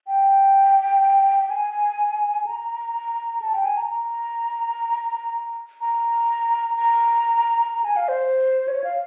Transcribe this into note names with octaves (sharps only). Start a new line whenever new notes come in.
G5
G#5
A#5
A5
G5
G#5
A#5
A#5
A#5
A#5
A#5
G#5
F5
C5
C#5
F5